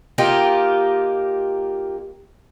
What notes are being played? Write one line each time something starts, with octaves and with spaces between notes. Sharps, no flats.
A#3 D#4 F4 G4